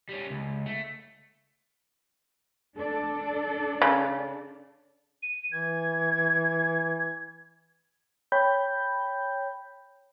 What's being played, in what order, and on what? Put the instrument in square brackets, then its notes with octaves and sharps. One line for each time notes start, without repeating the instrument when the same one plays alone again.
[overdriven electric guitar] G3 C#4
C#2
A3
[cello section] D4 A4 D5
[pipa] C#3
[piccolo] D#7
[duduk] E3 [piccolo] G#6
[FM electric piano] C#5 G5 B5 G6